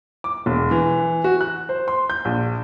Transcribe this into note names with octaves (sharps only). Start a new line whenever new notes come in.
D6
E1
E3
F#4
F#6
C5
C6
G6
A#1